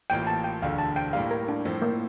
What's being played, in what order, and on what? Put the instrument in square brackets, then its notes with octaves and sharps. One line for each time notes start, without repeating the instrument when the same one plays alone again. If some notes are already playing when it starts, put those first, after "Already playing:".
[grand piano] A1 A2 E3 A#3 F4 [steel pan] G5
[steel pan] A5
G5
[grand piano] E1 D2 D3 [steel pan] F5
[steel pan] A5
G5
[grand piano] A2 G3 A#3 [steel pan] F5
[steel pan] A#4
D4
[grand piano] A2 F3 C4
[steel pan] A#3